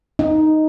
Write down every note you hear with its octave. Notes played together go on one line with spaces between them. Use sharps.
D#4